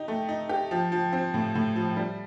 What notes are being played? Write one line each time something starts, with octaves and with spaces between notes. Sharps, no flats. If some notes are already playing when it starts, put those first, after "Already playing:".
Already playing: D#4 G4
A3
D#4
G4
F3
F3
C4
A2
A2
F3
G3